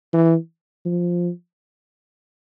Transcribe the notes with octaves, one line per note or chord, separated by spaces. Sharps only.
E3
F3